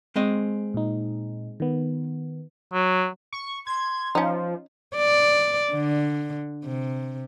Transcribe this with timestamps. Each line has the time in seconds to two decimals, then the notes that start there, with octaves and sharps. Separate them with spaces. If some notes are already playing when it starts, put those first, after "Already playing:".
0.16 G#3 C4 D#5
0.74 A#2 D#4
1.60 D#3 B3
2.73 F#3
3.33 C#6
3.67 C6 G#6
4.15 F3 C#4 D#4
4.96 D5
5.72 D3
6.65 C3